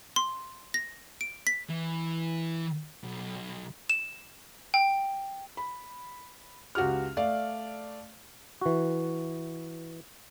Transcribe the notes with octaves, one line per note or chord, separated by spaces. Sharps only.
C6
A#6
D7
B6
E3
B1
E7
G5
B5
C#2 F#4 G4 F6
A3 D5 F5
E3 F#4